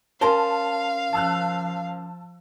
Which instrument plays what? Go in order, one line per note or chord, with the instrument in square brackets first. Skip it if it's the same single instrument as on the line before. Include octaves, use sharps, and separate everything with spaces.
[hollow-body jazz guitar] C#4 A#4 C5 [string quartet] F5 [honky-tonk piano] A5
[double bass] F3 [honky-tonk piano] A5 E6 F#6